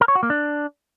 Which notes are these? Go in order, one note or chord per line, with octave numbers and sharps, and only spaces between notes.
A#4
C#5
F#4
A#3
D4